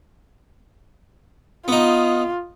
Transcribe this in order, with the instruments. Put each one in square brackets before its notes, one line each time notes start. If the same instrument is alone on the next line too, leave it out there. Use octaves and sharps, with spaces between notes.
[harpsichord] B3 D#4 [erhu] F4